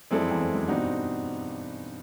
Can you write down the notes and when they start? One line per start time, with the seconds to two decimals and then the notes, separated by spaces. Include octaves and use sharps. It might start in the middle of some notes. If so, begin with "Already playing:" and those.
0.11 F#2 G#3 C4 E4 A4 D5
0.21 F2
0.30 E2
0.40 F2
0.54 F#2
0.68 G2 B2 G3 C4 D#4 F#4